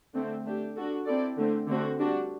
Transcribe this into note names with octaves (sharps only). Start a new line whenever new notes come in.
D3 A3 C4
A3 D4 G4
D4 F#4 A4
C4 E4 A4 D5
D3 A3 C4
D3 A3 C4 F#4
G3 D4 F#4